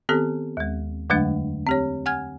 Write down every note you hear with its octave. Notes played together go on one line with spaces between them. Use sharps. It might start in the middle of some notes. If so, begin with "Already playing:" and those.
D#3 B3 C4 G4 A4
D#2 G#3
F2 D3 F#3 G#3 A3 D4
C4 G4 C#5
F#5 G#5 F6 G#6